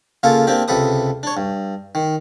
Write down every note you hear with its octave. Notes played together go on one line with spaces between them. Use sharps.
C#3 A#3 F4 A4
A#3 C4 D4 G4
C#2 C3 A4 B4 D#6
D4 C#5
G2
D#3